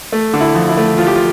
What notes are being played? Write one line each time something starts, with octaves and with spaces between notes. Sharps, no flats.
A3
D3
E4
F2
E4
A3
F2 F4
G4
F4